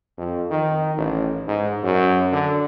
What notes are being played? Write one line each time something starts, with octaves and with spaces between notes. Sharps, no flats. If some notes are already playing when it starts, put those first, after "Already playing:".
F2
D#3
A1
G#2
F#2
D3